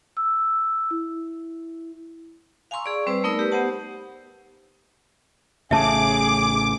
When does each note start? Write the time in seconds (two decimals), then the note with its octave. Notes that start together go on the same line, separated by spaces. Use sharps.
0.17 E6
0.91 E4
2.71 F5 G#5 A#5 C6 C#6 E6
2.85 G#4 D5 C#6
3.06 G3 C4 B4 C5 E6
3.24 A3 B3 D#4 A#4 D5 E6
3.39 G4 B4
3.52 B3 G4 C5 F#5 A5
5.71 A1 A2 C#3 G#4 E5 A5 D6